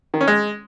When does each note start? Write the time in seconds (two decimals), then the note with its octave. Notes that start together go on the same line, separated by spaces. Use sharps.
0.14 D#3
0.21 C#4
0.28 G#3